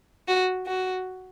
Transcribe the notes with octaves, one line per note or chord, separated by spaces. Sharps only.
F#4
F#4